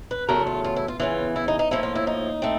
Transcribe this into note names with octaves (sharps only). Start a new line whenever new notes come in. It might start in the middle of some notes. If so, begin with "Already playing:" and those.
B4
E2 C#3 F#3 A3 A#4
F4
F4
E4
F4
E2 C#3 E3 F4
E4
D#4
D#4
A2 F3 A#3 E4
F4
E4
D#4
A3 C4